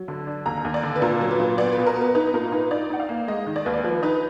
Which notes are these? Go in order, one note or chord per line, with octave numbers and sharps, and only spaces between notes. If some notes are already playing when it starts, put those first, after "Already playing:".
Already playing: F#3
D3
D4
D#2 A#5
D#2
D5
D3
B4
A#2 A#4
F#3
B4
A#2
B3 D5
B2 B4
A#4
B3 B4
D#4 B4
A#2 A#4
D#4 B4
D#4 D5
D#4 F#5
F5
A#3
G#3 D#5
D#3
D5
D#2 B4
D5
F3 B4
D#4 B4